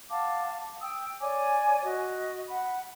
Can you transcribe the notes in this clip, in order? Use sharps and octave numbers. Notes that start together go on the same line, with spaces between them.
F5 F#5 A5 D6
G5 D#6 E6
C#5 D5 G#5 D6
F#4 D#5
F#5 B5